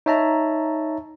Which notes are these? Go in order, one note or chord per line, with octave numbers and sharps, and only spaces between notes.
D#4 C#5 E5 A5 A#5